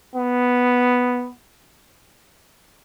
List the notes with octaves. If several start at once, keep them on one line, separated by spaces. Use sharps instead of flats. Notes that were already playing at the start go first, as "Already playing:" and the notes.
B3